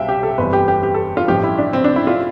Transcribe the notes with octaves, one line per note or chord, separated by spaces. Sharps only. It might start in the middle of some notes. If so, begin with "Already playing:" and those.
Already playing: C2 B2 G3 E5 F5 G5
G4
A4
G1 F2 E3 G3 B4
G4
G4
G4
A4
F4
A1 G2 F3 G4
E4
D4
C4
D4
E4
F4